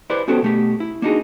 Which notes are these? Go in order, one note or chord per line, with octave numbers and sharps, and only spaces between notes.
E4 G4 B4 C5 D5 E5
B3 C#4 F#4 G4 A4 C5
B2 A3 G4
E4
A#3 D4 D#4 F#4 G#4